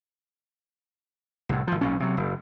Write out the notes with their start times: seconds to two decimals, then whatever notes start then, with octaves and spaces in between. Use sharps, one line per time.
1.49 C2 A2
1.67 G#1 F3
1.81 B1 A#2 C#4
2.00 C3 F#3
2.17 F#1